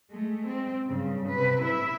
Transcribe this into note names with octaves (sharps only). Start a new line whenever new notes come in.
G#3 A3
C4
G2 C#3
C3 B4
E4 E5